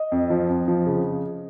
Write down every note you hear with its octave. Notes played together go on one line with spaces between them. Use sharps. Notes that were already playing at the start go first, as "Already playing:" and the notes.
Already playing: D#5
F2
F3
F2
F3
C#3